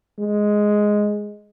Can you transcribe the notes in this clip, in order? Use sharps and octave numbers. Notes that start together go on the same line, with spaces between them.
G#3